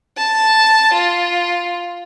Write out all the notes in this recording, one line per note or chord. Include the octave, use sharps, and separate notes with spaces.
A5
F4